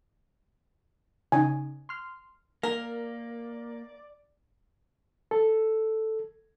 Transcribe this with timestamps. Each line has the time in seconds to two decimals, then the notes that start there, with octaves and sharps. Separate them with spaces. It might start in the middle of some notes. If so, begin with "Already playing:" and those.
1.32 C#3 D#4 G#5
1.89 C6 F6
2.63 A#3 A#4 D5
5.31 A4